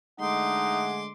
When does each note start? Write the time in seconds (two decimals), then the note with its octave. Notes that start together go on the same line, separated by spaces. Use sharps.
0.20 D3 G#3 A3 D#4 F#5 C6 D6